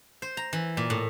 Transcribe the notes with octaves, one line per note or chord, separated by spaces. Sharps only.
C5
A#5
E3
A#2
A2